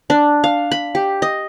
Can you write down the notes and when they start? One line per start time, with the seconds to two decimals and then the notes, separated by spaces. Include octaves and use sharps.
0.10 D4
0.44 F5
0.71 B5
0.95 G4
1.22 D#5